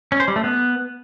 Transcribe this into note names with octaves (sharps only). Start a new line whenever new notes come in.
C#4
C5
G3
A3
B3